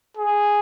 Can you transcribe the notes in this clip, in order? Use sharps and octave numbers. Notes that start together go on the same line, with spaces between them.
G#4